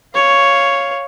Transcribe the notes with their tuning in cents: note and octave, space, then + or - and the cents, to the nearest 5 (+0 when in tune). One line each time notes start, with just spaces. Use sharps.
C#5 +0 F5 +0